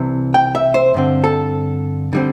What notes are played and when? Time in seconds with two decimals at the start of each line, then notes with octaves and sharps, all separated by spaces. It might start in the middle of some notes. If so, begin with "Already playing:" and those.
Already playing: C2 C3 E3
0.34 G5
0.55 E5
0.74 C5
0.94 G2 D3 C4
1.24 A4
2.13 D3 G3 C4